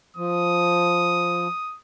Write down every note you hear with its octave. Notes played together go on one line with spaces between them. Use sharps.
F3 D#6